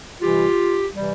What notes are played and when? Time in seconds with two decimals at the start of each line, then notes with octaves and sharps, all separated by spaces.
0.21 C3 E3 G3 F4 G4
0.94 C3 E3 G3